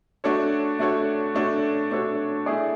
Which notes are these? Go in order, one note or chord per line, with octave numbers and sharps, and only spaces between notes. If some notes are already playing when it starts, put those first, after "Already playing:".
A3 D4 F#4 A4 C#5
A3 D4 F#4 A4 C#5
A3 D4 F#4 A4 C#5
A3 D4 F#4 A4 C#5
A3 E4 G#4 D5